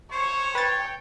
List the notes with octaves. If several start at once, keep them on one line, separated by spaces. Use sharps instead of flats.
C5 C#5 C#6
B4 G5 A6